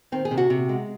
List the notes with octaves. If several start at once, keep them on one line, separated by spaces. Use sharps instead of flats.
D#3 C4
G#4
C3
F#4
C3
G#3